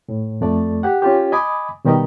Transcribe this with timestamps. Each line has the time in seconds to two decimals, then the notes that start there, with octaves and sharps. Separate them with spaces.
0.09 A2
0.41 F2 A3 D5
0.83 G4 F#5
1.02 C#4 F4 G4
1.32 D#5 G#5 B5 D6 D#6
1.85 B2 D#3 G3 G4 A#4 D#5